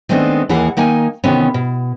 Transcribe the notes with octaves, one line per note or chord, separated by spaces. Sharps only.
D#3 G#3 A3 B3 C4 D4
D#2 E3 A#3 G#4 F#5
D#3 A#3 D#4 G#5
C3 D#3 E3 B3 C#4
B2